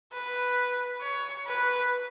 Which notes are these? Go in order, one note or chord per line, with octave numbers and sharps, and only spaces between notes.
B4
C#5
B4